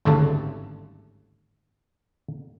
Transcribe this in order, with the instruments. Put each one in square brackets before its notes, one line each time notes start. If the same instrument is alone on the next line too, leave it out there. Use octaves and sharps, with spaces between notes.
[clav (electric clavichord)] G#1 D2 G2 C#3 A3 A4